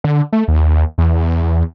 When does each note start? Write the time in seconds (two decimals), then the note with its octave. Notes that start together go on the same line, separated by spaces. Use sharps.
0.04 D3
0.32 A3
0.48 D#2
0.98 E2
1.42 E2